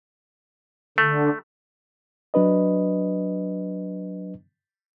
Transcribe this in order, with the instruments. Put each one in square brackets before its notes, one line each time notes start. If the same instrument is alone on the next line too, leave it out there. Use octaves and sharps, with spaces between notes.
[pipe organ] D3 [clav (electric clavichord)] A3
[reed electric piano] F#3 D4 B4 D#5